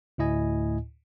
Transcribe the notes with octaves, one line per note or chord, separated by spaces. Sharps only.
D2 A2 E4 D#5 G#5